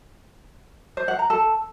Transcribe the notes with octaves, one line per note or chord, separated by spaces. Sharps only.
C5
F#5
A#5
A4